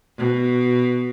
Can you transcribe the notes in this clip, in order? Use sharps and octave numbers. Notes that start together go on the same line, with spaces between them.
B2